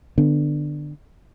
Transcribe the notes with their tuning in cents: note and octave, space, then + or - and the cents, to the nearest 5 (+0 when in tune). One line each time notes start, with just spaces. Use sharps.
D3 +15 B3 +10